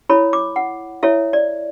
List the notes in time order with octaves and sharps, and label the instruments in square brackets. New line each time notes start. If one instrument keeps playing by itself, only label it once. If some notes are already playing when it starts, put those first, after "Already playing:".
[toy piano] E4 A4 C#5 B5
D6
F#5
E4 A4 C#5 E5
D5